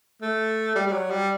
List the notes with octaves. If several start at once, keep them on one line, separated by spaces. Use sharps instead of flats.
A3
G3
G3
F#3
G3